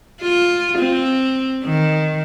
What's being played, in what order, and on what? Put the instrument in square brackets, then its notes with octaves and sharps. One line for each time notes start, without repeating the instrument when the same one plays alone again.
[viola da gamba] F4
C4
D#3